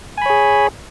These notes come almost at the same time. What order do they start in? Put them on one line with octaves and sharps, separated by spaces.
G#5 B5 C#5 G#4